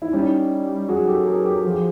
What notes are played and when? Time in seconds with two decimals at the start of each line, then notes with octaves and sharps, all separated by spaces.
0.02 E4
0.12 G3 C#4 D#4
0.89 F#3 F#4 G#4
1.07 G4 A4
1.26 G#4 A#4
1.45 G4 A4
1.64 F3 F#4 G#4